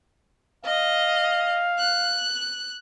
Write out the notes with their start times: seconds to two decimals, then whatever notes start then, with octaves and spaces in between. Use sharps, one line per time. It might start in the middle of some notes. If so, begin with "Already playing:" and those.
0.65 D#5 F5
1.79 F#6